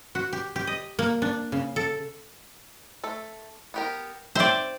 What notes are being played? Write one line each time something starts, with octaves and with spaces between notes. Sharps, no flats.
F#4
G4
G4
D#5
A#3
D4
C#3
A4
A3 A4
B3 G4 A#4
C4 C5 D5 E5 G5